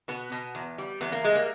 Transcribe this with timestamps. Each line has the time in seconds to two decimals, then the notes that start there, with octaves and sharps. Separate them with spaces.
0.08 B2 B3
0.32 B2
0.55 E2
0.78 G3
1.01 E2 B3
1.12 A#3
1.24 G3 G#3
1.35 A#3